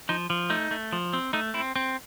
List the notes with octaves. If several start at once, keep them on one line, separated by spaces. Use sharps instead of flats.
F3 D#4
F3
A3 D#4
A3
F3
C4
A3 D#4
C4 E4
C4